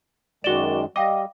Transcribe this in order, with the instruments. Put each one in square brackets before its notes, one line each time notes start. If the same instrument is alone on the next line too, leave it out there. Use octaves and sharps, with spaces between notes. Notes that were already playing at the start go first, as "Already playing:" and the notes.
[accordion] F#2 D#3 G#3 [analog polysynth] F#4 D5 [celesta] E7 G7
[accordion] G3 [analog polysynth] D#5 [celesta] F5 G5 D6